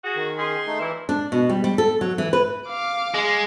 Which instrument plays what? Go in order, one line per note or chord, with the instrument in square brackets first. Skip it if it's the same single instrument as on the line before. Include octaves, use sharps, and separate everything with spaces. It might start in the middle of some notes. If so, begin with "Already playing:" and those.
[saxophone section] F#4 G#4
[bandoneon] D#3
[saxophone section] C#4 D#4 G#4 [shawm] C6
[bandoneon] A3 D#4
[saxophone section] A#2 E4 [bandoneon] E3
[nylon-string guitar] D4
B2
G3
G3
A4
F#3
E3
B4
[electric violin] F5 D6
[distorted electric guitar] G#3